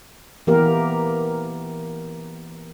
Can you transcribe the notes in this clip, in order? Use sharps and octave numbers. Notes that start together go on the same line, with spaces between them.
E3 A#3 B3 G4 A#4